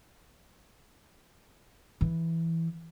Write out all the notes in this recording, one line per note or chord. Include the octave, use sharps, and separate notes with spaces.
E3